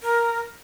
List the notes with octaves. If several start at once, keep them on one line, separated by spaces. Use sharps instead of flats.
A#4